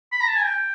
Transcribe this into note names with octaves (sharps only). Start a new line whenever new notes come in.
B5
A#5
A5
G#5
G5